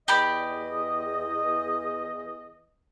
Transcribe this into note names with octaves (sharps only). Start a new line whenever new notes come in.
E2 G4 D5 D#5 B5